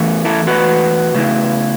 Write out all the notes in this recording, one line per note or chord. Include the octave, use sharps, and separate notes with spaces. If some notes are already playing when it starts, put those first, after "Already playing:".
Already playing: E2 E3 A3
E4 A4
F#4 B4
C#3 A3 E4